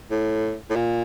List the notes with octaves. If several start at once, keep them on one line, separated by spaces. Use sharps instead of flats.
A2
A2
A#2